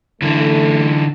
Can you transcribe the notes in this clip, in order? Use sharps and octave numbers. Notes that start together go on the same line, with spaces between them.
D3 E3 A3